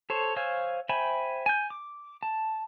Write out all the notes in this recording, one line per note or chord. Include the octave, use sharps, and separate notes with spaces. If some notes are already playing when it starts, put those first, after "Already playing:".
A4 C5 C#5
C5 C#5 F5 G#5 E6
C5 E5 G5 G#5 B5
G#5 G6
D6
A5